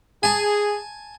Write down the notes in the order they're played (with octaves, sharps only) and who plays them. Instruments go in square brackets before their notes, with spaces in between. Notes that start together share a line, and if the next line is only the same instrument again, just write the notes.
[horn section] G#4 [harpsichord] G#5 A5